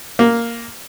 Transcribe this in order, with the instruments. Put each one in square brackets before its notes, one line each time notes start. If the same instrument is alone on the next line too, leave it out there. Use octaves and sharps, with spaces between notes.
[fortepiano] A#3